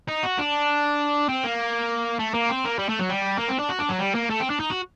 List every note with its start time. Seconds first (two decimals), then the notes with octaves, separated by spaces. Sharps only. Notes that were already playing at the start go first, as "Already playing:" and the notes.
0.09 D#4
0.24 F#4
0.39 D4
1.29 C4
1.44 A#3
2.19 A3
2.34 A#3
2.49 C4
2.65 A#3
2.79 G3
2.89 A3
3.00 F#3
3.10 G3
3.39 A#3
3.49 C4
3.60 D4
3.70 F#4
3.80 D4
3.90 F#3
3.99 G3
4.15 A#3
4.30 A3
4.40 C4
4.50 D4
4.60 D#4
4.70 F#4